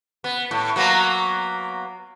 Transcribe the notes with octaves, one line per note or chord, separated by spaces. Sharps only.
B3
A2
F#3 A#3 B3